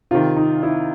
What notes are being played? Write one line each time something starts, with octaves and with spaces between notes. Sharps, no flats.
C3 D#3 F4
D#4
E4